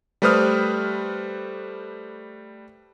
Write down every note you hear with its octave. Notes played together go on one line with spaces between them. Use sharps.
G3 A3 B4 C5 D#6 F6